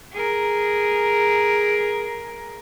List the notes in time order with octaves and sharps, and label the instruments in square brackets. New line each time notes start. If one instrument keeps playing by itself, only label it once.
[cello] G#4 A#4